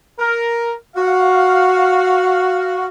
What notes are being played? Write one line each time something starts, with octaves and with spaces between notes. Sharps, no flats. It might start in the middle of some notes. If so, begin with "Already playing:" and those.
A#4
F#4 F5